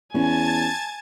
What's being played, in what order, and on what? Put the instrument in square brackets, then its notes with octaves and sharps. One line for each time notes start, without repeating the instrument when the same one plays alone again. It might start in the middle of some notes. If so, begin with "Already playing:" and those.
[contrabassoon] E2 [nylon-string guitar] C#4 [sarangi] G#5 [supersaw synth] A5 G#6 A6